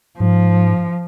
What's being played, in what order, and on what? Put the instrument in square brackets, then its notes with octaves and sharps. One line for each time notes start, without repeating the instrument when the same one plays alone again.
[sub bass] G#2 [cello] F3